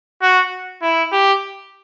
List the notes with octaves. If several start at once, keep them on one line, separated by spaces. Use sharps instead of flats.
F#4
E4
G4